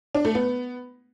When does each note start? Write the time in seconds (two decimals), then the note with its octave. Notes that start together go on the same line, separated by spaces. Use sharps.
0.15 D4
0.25 A3
0.35 B3